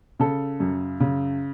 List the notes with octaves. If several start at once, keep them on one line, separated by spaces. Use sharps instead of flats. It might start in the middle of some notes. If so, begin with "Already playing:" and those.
C#3 A4
F#2
C#3